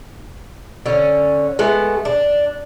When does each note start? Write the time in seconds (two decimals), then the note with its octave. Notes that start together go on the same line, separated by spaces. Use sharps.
0.86 D3 C#4
1.59 G#3 A3 B3
2.05 D4